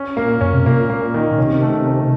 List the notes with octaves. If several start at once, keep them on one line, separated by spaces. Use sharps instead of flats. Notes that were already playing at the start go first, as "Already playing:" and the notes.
Already playing: C#4
A#2 A#3
F#2 C#4
C3
A#2 A#3
A#3
D#3
C3 C#4
A3
A3